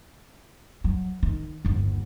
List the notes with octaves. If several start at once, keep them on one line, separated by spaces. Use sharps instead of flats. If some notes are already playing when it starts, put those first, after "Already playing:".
F#3
D#3
G1 D#2